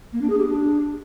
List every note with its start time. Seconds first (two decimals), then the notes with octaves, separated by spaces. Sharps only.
0.13 A#3
0.21 D4
0.30 G#4
0.38 G4
0.47 D4